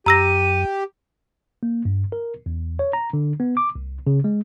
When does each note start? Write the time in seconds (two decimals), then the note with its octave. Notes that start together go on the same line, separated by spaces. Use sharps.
0.06 F#2 G4 A#5 E6 A#6 D#7
1.63 A#3
1.85 G2
2.12 A#4
2.46 E2
2.79 C#5
2.93 A#5
3.13 D3
3.40 B3
3.57 D6
3.75 C2
4.07 C#3
4.24 G#3